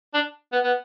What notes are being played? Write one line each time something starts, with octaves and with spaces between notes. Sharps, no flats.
D4
B3
B3